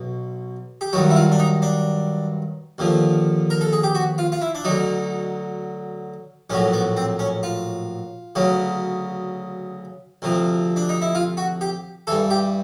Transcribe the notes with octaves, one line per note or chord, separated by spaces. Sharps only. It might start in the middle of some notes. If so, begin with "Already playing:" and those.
Already playing: B1 B2
G4
G2 D#3 F#3 F#4
E4
F4
D4
D#4
D4
D#2 D3 F3
A#4
A4
G#4
G4
F#4
F4
F4
E4
D4
D2 D3 F#3 D#4
A#1 A2 F#3 C#4
B3
C4
C#4
F4
D2 C#3 F#3
D2 C3 F3
D4
D#4
E4
F4
F#4
G4
G2 E3 A4
G4